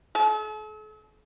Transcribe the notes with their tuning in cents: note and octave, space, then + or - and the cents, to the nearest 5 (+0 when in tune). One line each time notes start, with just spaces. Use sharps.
A4 -45